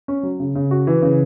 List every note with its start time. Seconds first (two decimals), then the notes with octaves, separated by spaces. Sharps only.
0.08 C#4
0.23 F#3
0.40 C#3
0.55 C#3
0.71 F#4
0.87 E3
1.02 C#3